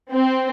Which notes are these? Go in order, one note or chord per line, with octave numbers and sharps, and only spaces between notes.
C4